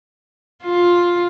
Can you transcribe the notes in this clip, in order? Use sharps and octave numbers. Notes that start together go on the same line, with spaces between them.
F4